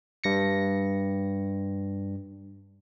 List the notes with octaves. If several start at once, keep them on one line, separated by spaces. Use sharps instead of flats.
G2 A#6 C#7